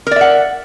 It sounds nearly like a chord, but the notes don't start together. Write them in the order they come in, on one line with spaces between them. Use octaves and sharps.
A#4 D5 E5 F#5